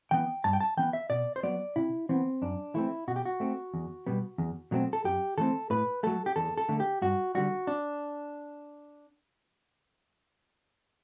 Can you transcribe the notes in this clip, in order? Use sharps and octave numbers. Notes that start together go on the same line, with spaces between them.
E3 B3 G5
G2 A5
G5
A5
E3 B3 G5
E5
B2 D5
C5
F#3 B3 D5
C3 E4
E3 B3 C4
F#2 D4
E3 A3 C4 E4
B2 F#4
G4
F#4
A3 C4
E2
B2 G3 B3
E2
B2 F#3 A3 C4
A4
F#2 G4
E3 A3 C4 A4
A2 B4
F#3 A3 A4
G4
E2 A4
A4
D3 A3
G4
G2 F#4
D3 G3 F#4
D4